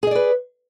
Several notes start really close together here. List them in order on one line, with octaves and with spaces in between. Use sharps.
G#4 D#5 D5 B4